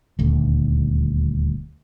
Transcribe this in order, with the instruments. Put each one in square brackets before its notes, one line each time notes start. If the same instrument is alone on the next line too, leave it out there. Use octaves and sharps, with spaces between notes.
[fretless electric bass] D#1 D2